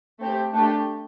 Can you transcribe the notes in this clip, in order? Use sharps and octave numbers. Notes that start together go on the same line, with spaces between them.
A3 C4 G4
A3 D4 G4